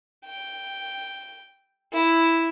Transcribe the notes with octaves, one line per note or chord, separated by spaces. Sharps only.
G5
E4